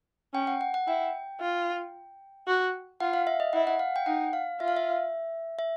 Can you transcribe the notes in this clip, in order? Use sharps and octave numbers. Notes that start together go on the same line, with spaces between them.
C#4 G5
F#5
F#5
F#5
E4 G5
F4
F#4
F4 F#5
F5
E5
D#5
E4 F#5
F#5
F5
G5
D#4 F#5
F5
F4 E5
F5
E5
E5